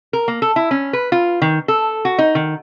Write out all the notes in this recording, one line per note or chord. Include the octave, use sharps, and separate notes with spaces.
A#4
A#3
A4
E4
C#4
B4
F4
D#3
A4
F#4
D#4
D#3